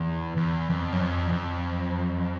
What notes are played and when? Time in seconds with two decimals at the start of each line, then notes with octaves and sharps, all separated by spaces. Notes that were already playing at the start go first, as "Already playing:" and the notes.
Already playing: E2
0.37 E2
0.70 F2
0.92 F#2
1.00 F2
1.27 E2
1.32 F2